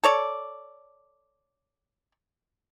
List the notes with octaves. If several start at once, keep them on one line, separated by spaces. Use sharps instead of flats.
A4 C#5 D5